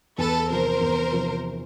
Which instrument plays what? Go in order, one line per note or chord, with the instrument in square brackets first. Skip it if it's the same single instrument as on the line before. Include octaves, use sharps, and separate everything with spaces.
[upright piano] E2 [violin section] A4 B4
[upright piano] C3 F3 [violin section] A#4 C5
[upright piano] E2
C3 F3